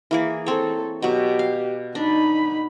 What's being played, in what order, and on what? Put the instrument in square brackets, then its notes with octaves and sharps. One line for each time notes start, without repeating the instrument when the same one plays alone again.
[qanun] E3 A#3 G#4
[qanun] C4 C#5 [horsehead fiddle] A4
[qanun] B2 F#3 [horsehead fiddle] G4
[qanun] F5
[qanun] D4 [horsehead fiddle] D#4 B5